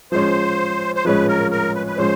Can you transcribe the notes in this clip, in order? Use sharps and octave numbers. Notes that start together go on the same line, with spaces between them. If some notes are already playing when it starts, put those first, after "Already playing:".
F3 G#3 C#4 C5
C5
F3 G#3 C#4 B4
A#4
A#4
B4
B4
F3 G#3 C#4 C5